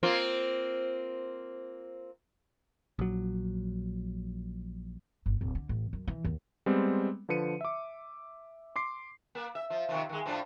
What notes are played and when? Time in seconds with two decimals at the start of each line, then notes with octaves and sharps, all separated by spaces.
0.03 A#3 C4 F4
2.99 A#1 F#3
5.26 G1
5.41 D1
5.55 D3
5.69 A1
5.93 F#2
6.08 E3
6.25 D#2
6.66 G3 G#3 B3 C4
7.29 D3 F3 B4 C#7 D#7
7.61 E5 D6
8.76 C6 D6 C7
9.35 A#3
9.55 E5
9.70 F3
9.89 C3 D#3 F3
10.09 D#3 G#3
10.26 A2 F3 D4